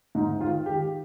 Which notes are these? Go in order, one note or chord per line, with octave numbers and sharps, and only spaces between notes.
G#2 D#4
D#3 F4
D#3 G4